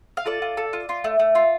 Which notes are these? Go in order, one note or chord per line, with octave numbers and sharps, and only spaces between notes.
F5
F4 A4 D5
F4
A4
F4
F4
A3
A3
F4